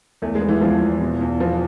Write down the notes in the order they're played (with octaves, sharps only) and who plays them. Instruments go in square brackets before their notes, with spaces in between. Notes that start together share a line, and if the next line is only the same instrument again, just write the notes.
[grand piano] E2 [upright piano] A3
[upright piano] G#3
[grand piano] B3
[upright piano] E3
[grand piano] E2 [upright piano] F3
[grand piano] E2
B2
E2
[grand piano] B2 [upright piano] F3